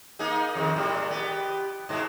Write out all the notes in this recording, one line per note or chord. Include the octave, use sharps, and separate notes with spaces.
A#3 D#4 G#4
F2 C3 D#3
A2 C3 G3
B3 G4
G#2 B2 G#3